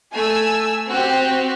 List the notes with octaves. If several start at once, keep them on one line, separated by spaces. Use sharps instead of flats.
A3 G#5 E6
C4 F#4 G4